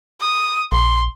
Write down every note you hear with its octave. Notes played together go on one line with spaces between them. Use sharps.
D#6
A#1 C6